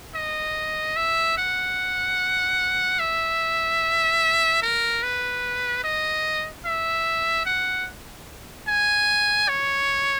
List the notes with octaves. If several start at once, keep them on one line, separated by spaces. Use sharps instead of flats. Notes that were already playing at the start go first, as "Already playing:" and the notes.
D#5
E5
F#5
E5
A#4
B4
D#5
E5
F#5
G#5
C#5